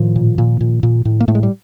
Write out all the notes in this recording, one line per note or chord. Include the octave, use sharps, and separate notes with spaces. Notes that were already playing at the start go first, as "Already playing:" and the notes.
Already playing: A2 D#3 F3
A#2
A#2
A#2
A#2
A2
A#3
A2 A3
G#3
G3